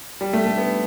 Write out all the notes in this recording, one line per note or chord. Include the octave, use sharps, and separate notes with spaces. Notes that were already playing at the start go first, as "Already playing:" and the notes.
G3
A3
A3
B3